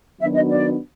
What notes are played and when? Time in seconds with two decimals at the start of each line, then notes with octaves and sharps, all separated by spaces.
0.21 D#3 F#3 B3 D4 F#4 E5
0.35 D#5
0.49 D5